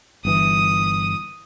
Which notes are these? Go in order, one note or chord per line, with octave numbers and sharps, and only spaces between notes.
G1 E3 D#6